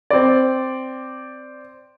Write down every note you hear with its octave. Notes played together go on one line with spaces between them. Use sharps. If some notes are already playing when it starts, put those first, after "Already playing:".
C4 D5